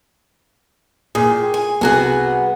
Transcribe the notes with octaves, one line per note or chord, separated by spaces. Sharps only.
A#2 G4 G#4
G#5
C2 B3 F#4 G#4 G#5 F#6